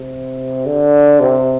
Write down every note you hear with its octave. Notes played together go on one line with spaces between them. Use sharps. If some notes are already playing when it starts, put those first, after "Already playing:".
Already playing: C3
D3
C3